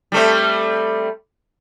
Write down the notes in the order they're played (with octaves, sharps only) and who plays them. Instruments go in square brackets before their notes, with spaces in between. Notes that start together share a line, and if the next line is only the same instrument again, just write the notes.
[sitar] G3 A3 C4